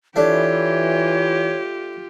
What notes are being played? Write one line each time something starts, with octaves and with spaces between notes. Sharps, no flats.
E3 A3 D4 F4 G4 C#5